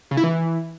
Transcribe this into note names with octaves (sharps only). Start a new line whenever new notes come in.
C#3
E4
E3